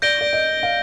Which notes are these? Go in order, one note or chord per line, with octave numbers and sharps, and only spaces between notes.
D5 G6 A#6 D7 G7
D5
D#5
F5